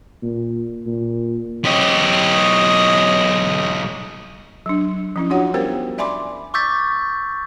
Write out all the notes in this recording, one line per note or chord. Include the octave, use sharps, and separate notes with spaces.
A#2
A#2
B1 G4 C#5 D#5
F#3 D4
F3 C#4 E4
D4 F4 F#4 C#5 F#5
G3 B3 G4 A#4 C5 G5
D5 E5 G#5 B5 C6 D6
C#6 D6 E6 G6 A6 B6